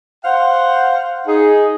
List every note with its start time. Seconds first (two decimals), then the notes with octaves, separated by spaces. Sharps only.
0.25 C5 F5 F#5
1.27 D#4 G#4